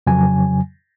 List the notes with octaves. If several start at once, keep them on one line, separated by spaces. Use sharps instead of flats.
F2 C#3 F#3 G#5